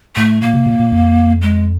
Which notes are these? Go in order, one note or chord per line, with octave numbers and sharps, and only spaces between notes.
A2 A3
A#2 A#3
C3
A#2
A#2
F2
G#3